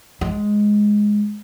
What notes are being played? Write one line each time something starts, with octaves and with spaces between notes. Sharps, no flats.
G#3